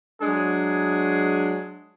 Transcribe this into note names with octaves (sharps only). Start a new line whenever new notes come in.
F#3 G#3 D4 G#4